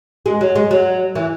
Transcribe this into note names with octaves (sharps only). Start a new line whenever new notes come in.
G#3
F#3
G#3
F#3
E3